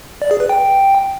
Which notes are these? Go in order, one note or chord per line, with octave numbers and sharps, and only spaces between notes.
D5
G#4
B4
G5